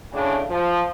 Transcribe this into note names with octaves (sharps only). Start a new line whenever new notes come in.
A2 C#3 D4
F3